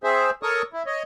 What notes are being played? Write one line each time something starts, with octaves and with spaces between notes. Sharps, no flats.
C4 G#4 C5 E5
A4 A#4 C#5 C#6 D#6
E4
C#5 D#5